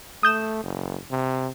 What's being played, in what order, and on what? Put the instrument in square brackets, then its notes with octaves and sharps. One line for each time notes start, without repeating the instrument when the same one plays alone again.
[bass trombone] A3 [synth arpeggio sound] D#6 G6 E7
[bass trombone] F#1
C3